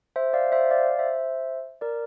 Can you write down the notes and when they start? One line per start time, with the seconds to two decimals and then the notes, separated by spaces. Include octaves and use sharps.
0.16 C5 E5
0.33 D5 F5
0.52 C5 E5
0.71 D5 F5
0.99 C5 E5
1.81 A#4 D5